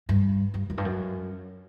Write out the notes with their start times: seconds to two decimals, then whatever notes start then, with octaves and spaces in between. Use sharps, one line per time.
0.09 G2
0.54 G2
0.70 F#2
0.78 G2
0.85 F#2